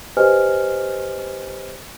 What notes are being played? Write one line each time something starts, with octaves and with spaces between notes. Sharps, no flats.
G4 B4 C5 D#5 G#5 F6